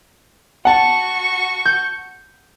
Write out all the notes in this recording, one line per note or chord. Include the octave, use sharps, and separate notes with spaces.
F#4 F#5 A5 C#6
G6